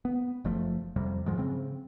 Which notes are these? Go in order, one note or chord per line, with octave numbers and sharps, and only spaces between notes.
B3
F#1 F3 A3
F2 C3 G3
G#2 F3 F#3 G#3
C#3 C4